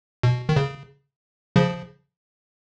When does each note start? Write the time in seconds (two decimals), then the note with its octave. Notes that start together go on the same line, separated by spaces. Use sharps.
0.23 B2
0.49 D#3
0.56 C#3
1.56 C#3 F3